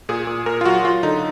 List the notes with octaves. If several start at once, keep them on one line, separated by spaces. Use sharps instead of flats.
A#2 G#4
A#2
A#2 A#4
F4
F#3 F#4
F#3 F4
D3 D#4